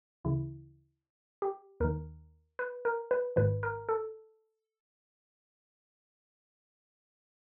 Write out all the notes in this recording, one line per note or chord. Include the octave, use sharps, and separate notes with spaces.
D2 C#3 E3 E4
G4
D#2 D#3 A#4
B4
A#4
B4
G#1 G#2 D#3 B4
A#4
A4